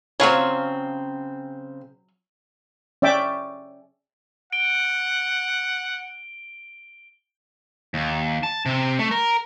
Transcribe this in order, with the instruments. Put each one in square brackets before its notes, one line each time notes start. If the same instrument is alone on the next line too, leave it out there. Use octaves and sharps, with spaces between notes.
[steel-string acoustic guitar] C#3 C4 [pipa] F#3 F4 C#5
[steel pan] C#4 D5 E5 G5 D6
[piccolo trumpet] F#5 [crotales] D7 G7
[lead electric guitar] D#2
A5
C3
A3
A#4